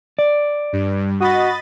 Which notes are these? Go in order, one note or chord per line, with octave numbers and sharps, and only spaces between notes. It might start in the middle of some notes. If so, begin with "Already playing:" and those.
D5
G2
F#4 D#5 B5 A6